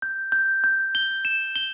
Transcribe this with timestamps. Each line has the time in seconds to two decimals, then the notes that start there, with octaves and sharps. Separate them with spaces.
0.02 G6
0.32 G6
0.64 G6
0.95 G7
1.25 E7
1.56 G7